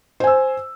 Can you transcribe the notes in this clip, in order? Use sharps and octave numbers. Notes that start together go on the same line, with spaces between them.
C5 G#5 E6